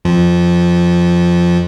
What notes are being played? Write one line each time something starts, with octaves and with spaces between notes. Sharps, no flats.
F2 F3